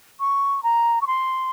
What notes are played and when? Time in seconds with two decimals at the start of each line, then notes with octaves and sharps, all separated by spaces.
0.20 C#6
0.63 A#5
1.01 C#6
1.07 C6